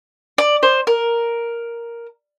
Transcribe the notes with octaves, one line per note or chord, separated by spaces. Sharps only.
D5
C5
A#4